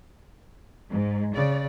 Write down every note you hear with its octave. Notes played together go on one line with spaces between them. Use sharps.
G#2
C#3 D5